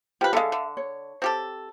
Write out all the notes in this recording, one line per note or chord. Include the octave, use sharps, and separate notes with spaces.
F3 G4 B4
D3 G#3 A4 E5 F5
D3
C#5
C4 G4 A4